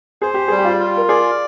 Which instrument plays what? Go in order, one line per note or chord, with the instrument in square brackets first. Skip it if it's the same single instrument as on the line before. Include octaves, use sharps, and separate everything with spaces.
[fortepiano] G#4 [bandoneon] C5
[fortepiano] G4
G#4
[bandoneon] G3
[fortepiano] G4
F4
[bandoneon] F4
[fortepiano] A#4
[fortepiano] G#4 [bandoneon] D5